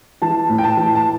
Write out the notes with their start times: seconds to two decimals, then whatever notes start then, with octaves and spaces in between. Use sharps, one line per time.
0.22 E3 A5
0.49 A2
0.58 G5
0.64 A5
0.77 E3
0.95 A5